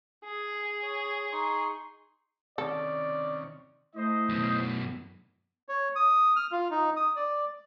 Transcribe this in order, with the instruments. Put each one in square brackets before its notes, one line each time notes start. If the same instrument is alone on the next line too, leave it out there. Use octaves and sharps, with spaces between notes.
[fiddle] G#4
[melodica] C#5
D#4 C6 C#6
[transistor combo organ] C3 D#3 C#4 [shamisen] A4 [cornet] D5
[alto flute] A3 [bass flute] E4 [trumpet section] C5 D#5
[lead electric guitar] F#2 B2
[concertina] C#5
D#6
F6
F4
D#4
D#6
D5